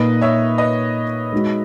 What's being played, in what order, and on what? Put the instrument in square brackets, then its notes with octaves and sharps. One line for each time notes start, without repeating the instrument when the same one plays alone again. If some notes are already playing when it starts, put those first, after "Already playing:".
Already playing: [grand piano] A#2 A#3 D#4 [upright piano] B4 D#5
[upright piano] C#5 E5
B4 D#5
[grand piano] G#3 D#4 F#4